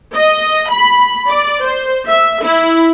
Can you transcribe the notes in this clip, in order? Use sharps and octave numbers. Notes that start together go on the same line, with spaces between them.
D#5
B5
D5
C5
E5
E4